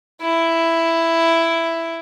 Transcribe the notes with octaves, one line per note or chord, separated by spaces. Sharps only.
E4